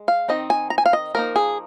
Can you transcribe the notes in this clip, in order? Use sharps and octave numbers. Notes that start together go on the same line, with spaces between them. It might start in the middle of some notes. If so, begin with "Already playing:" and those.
Already playing: G#3
F5
D#3 C4 D#4 D#5
G#5
A#5
G#5
F5
D#5
F3 A#3 D#4 A#4
G#4